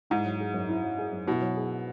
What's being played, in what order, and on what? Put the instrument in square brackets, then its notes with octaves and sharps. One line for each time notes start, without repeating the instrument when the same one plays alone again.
[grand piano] G#2 [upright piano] E4
[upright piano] F#3
G#4
F#2
E4
F#3
G#4
F#2
[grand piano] B2 [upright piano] E4
[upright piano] F#3
G#4